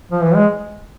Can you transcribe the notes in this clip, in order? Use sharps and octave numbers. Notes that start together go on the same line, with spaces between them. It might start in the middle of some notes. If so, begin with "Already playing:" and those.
F3
E3
G#3